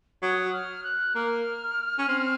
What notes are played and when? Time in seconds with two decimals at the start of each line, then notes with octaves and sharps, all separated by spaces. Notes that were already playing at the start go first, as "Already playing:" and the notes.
0.22 F#3 D#6
0.53 F6
0.84 F#6
1.15 A#3 F6
1.98 C#4
2.09 C4